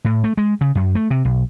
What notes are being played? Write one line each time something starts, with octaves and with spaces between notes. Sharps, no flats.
A2
A3
G#3
C#3
F#2
A3
C3
B1